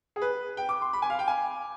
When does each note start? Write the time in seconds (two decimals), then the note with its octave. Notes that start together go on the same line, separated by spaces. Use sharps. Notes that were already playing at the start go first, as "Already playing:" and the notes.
0.16 G#4
0.22 B4
0.57 G5
0.69 D6
0.82 C6
0.93 B5
1.02 G#5
1.10 F5
1.19 G5
1.28 G#5